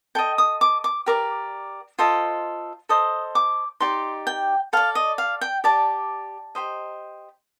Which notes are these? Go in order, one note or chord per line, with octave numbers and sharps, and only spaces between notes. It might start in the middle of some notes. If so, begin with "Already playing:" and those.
A4 D#5 G5
D#6
D6
D6
G4 A#4 D5 D6
F4 A4 C5 D#5
A4 C5 D#5 D#6
D6
D#4 G4 D5 C6
G5
A4 D5 F5
D#5
F5
G5
G4 D5 A5
G4 C5 D#5